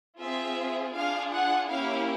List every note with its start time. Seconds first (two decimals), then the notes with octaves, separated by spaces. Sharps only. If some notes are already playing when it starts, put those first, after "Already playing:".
0.20 C4 F4 G#4 E5
0.96 D4 F4 G#4 F5
1.34 F#5
1.71 A#3 C#4 E4 G4 F5